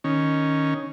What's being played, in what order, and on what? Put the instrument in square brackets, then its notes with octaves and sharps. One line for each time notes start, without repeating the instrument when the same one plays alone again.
[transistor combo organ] D#3 C#4